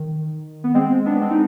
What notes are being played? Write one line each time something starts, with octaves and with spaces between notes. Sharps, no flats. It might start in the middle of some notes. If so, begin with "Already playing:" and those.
Already playing: D#3
B3
G#3 C4
B3 D4
B3
G#3 C4
D#4